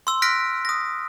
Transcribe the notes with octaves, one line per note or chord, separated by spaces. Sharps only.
C6 E6
F6 F#6 A#6 B6 D7
D#6 A#6